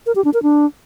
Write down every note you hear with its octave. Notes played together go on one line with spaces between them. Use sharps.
A#4
G4
D4
A#4
D4